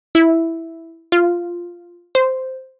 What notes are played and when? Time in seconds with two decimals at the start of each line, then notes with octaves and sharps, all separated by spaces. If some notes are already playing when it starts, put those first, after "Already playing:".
0.15 E4
1.12 F4
2.15 C5